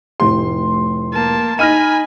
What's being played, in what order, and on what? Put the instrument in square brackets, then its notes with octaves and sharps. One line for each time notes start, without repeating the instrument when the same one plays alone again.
[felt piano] F1 A2 G4 [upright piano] C6
[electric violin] A#3 A5
[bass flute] D#4 [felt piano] D#5 F6 A#6 [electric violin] G#5 B5 [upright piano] D#7